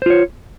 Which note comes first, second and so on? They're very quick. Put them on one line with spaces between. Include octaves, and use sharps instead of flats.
C5 F4 C#5